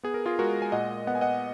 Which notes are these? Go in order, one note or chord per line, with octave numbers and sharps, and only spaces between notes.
B3 G#4
A#4
F4 G#4
G#3 F#4 A#4
G#5
A#2 D#5 F#5
B3 F#5
G#5
D#5 F#5